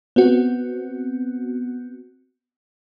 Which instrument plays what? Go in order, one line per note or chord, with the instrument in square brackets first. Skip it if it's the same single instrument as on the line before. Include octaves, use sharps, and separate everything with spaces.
[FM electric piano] B3 C4 F#4